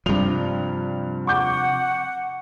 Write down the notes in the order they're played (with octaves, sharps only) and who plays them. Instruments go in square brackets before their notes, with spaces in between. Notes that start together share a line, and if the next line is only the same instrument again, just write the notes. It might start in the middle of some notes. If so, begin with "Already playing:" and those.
[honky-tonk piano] G2 F7 [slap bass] C3 F3
[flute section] F#5 [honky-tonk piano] C#6 D6 G6